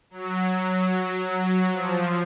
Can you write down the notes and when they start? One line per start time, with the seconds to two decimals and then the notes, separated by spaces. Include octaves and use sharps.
0.10 F#3
1.32 F#3
1.72 F3